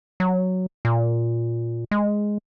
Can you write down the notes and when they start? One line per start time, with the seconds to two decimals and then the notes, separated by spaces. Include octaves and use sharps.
0.20 F#3
0.85 A#2
1.91 G#3